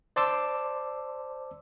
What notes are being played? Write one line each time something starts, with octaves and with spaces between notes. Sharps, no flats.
C5 D5 A5 C6 D6 E6